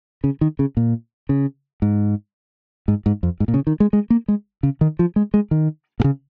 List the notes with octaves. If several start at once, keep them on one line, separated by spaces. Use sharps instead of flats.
C#3
D#3
C#3
A#2
C#3
G#2
G#2
G#2
F2
G#2
A#2
C#3
D#3
G#3
G#3
A#3
G#3
C#3
D#3
F3
G#3
G#3
D#3
A#2
C#3